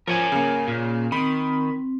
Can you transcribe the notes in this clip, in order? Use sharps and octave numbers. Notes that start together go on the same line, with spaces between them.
F3 A#4 C#5 G#5
C#3 A#3
A#2
D#3 C4 B5